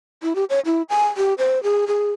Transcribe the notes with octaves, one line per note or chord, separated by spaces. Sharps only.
E4
G4
C#5
E4
G#5
G4
C5
G#4
G#4